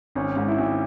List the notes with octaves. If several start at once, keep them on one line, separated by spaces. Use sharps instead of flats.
G#1 C#4
G#2
E4
G#1